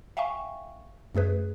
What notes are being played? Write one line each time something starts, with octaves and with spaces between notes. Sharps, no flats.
E5 F5 G5 G#5 C#6
F#2 A3 G#4 B4